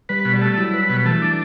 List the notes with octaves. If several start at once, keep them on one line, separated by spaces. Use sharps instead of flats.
G3 B4
B2
G3
A3
F#3 E4
B4
B2
E3 A3
D4